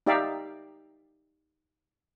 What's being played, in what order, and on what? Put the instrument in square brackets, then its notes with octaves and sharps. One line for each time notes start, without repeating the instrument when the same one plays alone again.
[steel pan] D#4 G4 D5 E5 F5